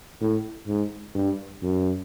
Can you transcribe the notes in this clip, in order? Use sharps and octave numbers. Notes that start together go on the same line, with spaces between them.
A2
G#2
G2
F#2